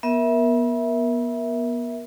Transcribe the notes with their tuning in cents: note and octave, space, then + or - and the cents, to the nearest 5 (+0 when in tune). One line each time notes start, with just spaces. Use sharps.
B3 -30 A#4 +20 E5 -5